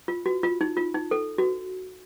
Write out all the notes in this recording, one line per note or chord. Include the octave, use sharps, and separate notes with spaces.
F4
F#4
F4
D#4
F4
D#4
A4
F#4